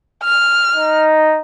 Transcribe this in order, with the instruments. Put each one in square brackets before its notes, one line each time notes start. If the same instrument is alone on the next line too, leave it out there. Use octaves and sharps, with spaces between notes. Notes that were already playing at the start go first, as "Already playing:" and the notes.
[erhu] F6
[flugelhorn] D#4